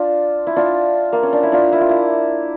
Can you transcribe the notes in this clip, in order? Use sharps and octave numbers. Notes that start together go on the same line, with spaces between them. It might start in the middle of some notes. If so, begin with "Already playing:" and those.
Already playing: D4 F4
E4
D4 F4
A#3
C#4
D4
E4
D4 F4
E4
F4
E4